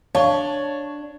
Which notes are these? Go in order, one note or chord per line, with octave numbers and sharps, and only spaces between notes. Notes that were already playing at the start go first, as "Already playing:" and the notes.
D4 C#5 F5 A5 C#6